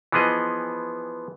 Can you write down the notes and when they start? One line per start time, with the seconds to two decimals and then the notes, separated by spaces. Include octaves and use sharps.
0.12 E3 F3 B3 G#4 D#5